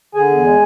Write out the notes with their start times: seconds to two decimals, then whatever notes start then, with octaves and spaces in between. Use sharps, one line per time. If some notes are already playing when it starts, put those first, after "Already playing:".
0.14 D3 G#4 G#5
0.29 E2
0.44 G#3